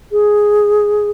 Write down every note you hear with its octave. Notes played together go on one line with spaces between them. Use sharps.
G#4